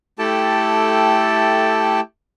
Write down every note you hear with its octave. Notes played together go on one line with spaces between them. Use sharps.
A3 E4 G4 A4 G5 A5